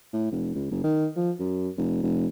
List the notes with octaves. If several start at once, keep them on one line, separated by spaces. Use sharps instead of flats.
A2
F1
C#2
F#1
D#3
F3
F#2
F1
F1